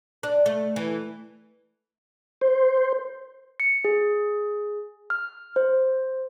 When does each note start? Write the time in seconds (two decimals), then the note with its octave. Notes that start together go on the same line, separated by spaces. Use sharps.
0.23 D4
0.46 A3
0.76 E3
2.41 C5
3.60 C#7
3.85 G#4
5.10 F6
5.56 C5